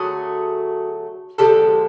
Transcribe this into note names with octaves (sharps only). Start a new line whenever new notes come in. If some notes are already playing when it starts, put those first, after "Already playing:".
Already playing: D3 F#3 A3 F#4 G#4
D3 F3 G#3 G4 A4